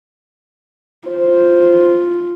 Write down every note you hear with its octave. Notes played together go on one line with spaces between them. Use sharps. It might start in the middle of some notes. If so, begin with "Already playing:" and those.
F4 C5